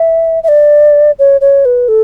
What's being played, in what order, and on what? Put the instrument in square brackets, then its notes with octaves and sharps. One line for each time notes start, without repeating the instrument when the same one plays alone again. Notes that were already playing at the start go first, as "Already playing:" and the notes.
Already playing: [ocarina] E5
E5
D5
C#5
C#5
B4
A4